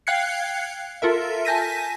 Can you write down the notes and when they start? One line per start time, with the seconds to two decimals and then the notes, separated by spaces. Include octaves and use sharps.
0.07 F5 G5 F#6 G#6 C7 C#7
1.02 F4 A4 A#4 E5
1.45 G#5 A5 G6 A#6 B6 D#7